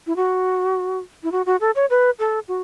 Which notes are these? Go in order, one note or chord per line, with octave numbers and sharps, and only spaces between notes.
E4
F#4
E4
F#4
F#4
A4
C#5
B4
A4
F#4